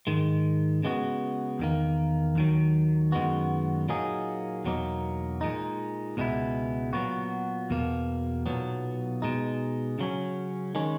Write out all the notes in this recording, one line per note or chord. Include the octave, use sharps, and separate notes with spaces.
G#2 D#3 G#3
C#3 G#3 B3 F#4
E2 D#3 A#3
D#2 D#3 F#3
F#2 D#3 G#3 B3 F#4
A#2 F#3 A#3 D#4 G#4
E2 B2 F#3 A#3 D#4
A#2 G#3 D#4
C#2 B2 G#3 B3 E4
A#2 F#3 B3 F#4
E2 B2 A#3
B1 A#2 F#3 B3
B2 G#3 D#4
C#3 F#3 C#4
D#3 G#3 C#4